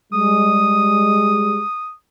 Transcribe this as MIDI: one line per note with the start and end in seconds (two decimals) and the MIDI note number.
0.13 1.62 55
0.13 1.62 56
0.13 1.93 87